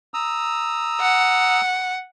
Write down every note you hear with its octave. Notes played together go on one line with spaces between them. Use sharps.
A#5 D#6 E6
F#5